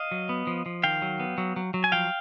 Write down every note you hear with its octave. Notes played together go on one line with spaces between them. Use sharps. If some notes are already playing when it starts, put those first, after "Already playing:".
Already playing: D#5 F5
F#3
B3
F3
F3
D#3 F5 G5
F#3
B3
F#3
F#3
F#3
G#5
F3 F5 G5